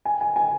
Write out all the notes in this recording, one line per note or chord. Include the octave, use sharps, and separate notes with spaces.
G#5
G#5
G#5